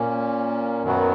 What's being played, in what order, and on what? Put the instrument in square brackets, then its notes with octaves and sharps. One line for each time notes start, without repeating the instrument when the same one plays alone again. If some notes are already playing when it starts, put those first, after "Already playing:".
Already playing: [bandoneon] A#2 A#3 C#4
F#2 D#3 F#3 B3 F#4